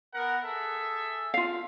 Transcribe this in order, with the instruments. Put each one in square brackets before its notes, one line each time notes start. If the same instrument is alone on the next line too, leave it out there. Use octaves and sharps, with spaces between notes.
[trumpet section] B3 A#4 F#5
G#4 A4 E5
[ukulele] F4 F5